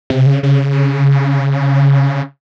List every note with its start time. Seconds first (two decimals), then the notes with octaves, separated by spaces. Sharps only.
0.10 C3
0.26 C#3
0.43 C#3